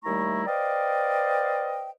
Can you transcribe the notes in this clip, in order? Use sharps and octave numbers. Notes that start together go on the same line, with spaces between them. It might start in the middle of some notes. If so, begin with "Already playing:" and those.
D#2 G3 A3 E4 A#5 C#6
B4 C5 D5 D#5 F5 G5